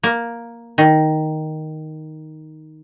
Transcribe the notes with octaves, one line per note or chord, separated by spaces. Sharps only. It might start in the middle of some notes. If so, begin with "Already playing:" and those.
A#3
D#3